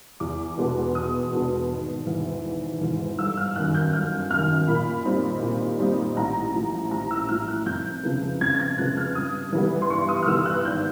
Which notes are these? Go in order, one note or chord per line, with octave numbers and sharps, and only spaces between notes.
E2 D6
B2 G#3 B3 D4
E2 D#6
B2 G#3 B3 D4
G#1
G#2 E3
G#1
G#2 E3
G1 E6
F6
F#2 D#3 F#6
G6
G1 F6
F#2 D#3 F6
A#2 B5
G3 C4 D#4
A#2
G3 C4 D#4
A1 A#5
A2 F3
A1 A#5
E6
A2 F3 F6
F#6
F2 G6
C#3 F3 G#3 B3
F2 G#6
A6
G#6
C#3 F3 G#3 B3 F#6
F6
G2 D#6
E3 G3 B3
C6
G2 C#6
D#6
F6
E3 G3 B3 E6
F#6
F#6
G#1 G6